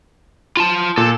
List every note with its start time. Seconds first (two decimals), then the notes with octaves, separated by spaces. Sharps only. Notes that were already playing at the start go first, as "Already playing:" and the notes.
0.57 F4 A5
0.97 A#2 A4